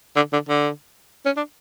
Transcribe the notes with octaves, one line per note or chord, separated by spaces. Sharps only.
D3
D3
D3
C#4
D4